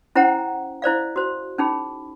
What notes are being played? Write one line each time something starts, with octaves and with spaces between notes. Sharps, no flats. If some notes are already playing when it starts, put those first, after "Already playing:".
C#4 E4 C5 F#5 G5 A#5
E4 C5 D5 F5
F#4 C5
C#4 D#4 G#4 B5